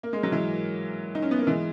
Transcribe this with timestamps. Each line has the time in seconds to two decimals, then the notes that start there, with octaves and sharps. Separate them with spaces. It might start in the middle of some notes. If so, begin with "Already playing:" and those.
0.03 A#3
0.13 G#3
0.23 F#3
0.32 E3 G#3
1.15 D#4
1.22 C#4
1.31 B3
1.39 A#3
1.47 E3 G#3